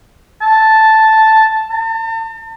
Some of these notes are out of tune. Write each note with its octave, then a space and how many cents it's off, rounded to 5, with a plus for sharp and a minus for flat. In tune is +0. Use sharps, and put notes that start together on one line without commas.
A5 +0
A5 +45